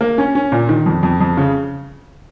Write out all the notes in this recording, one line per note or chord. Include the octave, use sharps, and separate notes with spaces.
A#3
C#4
C#4
A#2
D#3
F2
F2
F2
C#3